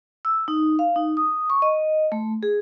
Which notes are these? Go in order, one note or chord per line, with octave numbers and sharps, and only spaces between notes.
E6
D#4
F5
D#4
D#6
C#6
D#5
A3
G#4